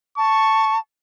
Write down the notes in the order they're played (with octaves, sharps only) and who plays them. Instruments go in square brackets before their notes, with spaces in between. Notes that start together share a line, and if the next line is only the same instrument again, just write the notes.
[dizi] A5 [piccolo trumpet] C#6